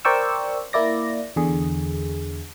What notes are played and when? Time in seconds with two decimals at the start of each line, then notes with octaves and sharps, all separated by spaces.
0.05 A#4 C5 D5 G5 C#6 E6
0.73 A#3 E4 D5 A#6
1.36 E2 D3 G#4